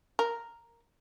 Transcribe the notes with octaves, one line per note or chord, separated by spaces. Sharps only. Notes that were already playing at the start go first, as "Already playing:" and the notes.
A#4